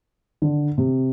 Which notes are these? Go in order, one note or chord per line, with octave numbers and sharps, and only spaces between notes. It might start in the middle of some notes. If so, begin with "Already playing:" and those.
D3
C3